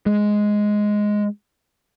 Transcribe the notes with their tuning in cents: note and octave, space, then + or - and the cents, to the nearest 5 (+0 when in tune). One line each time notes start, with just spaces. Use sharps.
G#3 +5